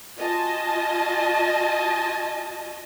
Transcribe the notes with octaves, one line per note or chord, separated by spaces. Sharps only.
F4 F#4 D#5 G#5 A5